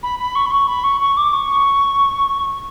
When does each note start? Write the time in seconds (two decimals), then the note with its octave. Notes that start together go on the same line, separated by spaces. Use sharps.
0.02 B5
0.18 B5
0.35 C#6
0.46 B5
0.51 C#6
0.67 B5
0.83 C#6
1.00 C#6
1.17 D6
1.33 C#6